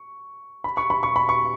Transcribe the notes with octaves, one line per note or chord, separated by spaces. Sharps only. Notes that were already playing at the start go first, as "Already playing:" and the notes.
Already playing: C#6
B5
C#6
B5
C#6
B5
C#6